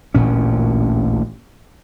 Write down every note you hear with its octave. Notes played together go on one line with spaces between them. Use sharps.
A1 D2 A#2 C#4